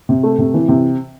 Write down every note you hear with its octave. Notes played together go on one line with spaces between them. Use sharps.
C3
A3
C3
E3
C3